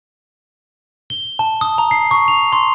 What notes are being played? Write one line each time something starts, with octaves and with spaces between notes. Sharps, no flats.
G7
A5
D#6
A#5
C7
C#6
F7
C6